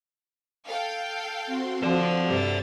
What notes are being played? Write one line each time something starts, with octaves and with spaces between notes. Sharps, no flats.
A4 F5 G5
C4 F#4 C6
F3 A4 D5
G2 C3 G3 E5 A6